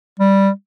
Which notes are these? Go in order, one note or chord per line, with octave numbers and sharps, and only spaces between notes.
G3